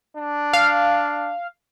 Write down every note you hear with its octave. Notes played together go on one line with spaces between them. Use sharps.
D4
F5